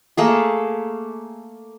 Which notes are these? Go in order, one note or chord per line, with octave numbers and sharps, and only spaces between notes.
A3 A#3 G#4